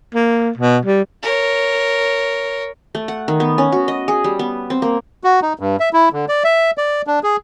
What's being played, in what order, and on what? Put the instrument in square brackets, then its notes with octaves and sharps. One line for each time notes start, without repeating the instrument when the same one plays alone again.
[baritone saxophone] A#3
B2
G3
[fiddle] A#4 C#5
[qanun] A3
F#5
D#3
B3
C#4
F#4
D#5
G#4
G3
B3
C4
A#3
[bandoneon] F#4
D#4
G2
E5
E4
D3
D5
E5
D5
D4
G#4